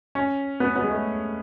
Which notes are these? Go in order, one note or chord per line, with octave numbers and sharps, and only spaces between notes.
C#4
B3
B3
G#3
A3